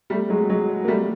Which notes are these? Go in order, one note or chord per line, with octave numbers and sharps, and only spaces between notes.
G3 A3
F#3 G#3
F#3 G#3
A#3
G3 A3